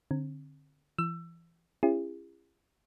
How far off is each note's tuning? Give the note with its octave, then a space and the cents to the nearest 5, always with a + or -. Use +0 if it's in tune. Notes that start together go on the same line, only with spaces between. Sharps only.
D3 +0 C4 +30
E3 +25 E6 +20
C#4 -20 E4 +40 G#4 -45